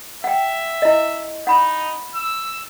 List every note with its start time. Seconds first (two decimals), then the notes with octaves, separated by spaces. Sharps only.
0.24 E5 F#5 G5
0.82 E4 D#5
1.47 D#4 F#5 B5
2.15 E6